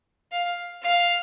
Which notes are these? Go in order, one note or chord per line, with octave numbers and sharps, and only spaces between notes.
F5
F5